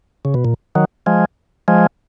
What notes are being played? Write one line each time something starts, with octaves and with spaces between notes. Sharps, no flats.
C#3
B2
A#2
D#3 F#3
F3 G#3
F3 G#3